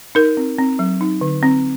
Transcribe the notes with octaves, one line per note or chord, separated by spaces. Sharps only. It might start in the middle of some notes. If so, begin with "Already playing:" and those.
D#4 A#4
C4
C4
F#3
D#4
D3
C4